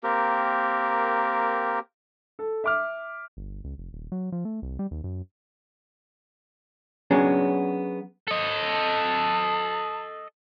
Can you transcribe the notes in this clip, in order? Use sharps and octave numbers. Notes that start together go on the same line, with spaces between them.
A#3 C4 G4 A#4
A4
E5 D6 F6
G1
C#2
F1
D#1
F#3
F3
A3
C2
G3
D#2
F#2
F#3 B3 C#4 D4 G#4
A4 D#5
A5